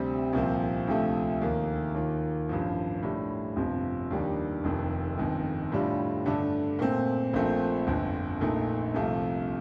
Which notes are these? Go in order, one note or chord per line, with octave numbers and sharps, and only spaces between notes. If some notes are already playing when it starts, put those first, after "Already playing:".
Already playing: D2 C3 G3 C4
C2 A#2 F3 C4
D2 C3 F3 A3
D#2 D#3 A#3
D#2 D#3 A#3 F4
A1 G2 F3
A2 G3 D4
G1 F2 C3 F3
D#2 D#3 G3 D4 G4
F1 F2 D#3
G1 F2 D#3
A2 G3 D4 F4
G2 D3 A3 D4
A#2 A3 C4
A#1 A#2 F3 A3 C4
G1 F2 D3
A#1 A#2 A3 D#4
C2 C3 F3 A3